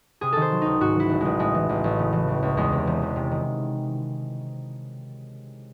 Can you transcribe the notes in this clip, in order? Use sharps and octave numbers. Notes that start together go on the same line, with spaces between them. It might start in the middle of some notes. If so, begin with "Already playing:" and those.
C3 G#4
D#3 A4
C5
F#3
C#2 D#4
G#2 F#4
E3 E4
A1
A1 G#3
A2 G#3
E3
A1
A1
C#3
E3
C#2
C#2
E2 G#3
C3
E1
E1
C3
D#3